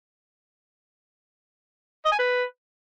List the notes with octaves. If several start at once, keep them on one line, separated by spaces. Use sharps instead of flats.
D#5
G#5
B4